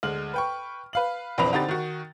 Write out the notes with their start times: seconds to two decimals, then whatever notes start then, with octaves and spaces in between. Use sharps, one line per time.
0.03 D2 G#3 F6 F#7
0.34 B4 G5 C#6
0.93 B4 F5 F#7
1.38 A#1 E2 C4 B4 B5 F7
1.53 D3 C4 D#4 G4 B5 A6
1.69 D#3 F#4